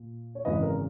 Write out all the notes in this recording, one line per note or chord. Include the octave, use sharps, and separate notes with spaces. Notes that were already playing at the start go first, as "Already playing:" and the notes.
Already playing: A#2
C#5
G#1 F#2 C#3 E3 B4 D#5
A#4